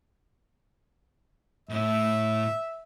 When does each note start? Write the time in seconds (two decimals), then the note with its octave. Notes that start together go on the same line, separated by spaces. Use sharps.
1.69 A2 E4 E5